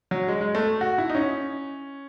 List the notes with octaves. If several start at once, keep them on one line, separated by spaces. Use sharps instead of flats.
F#3
G#3
G#3
A3
F#4
E4
D#4
C#4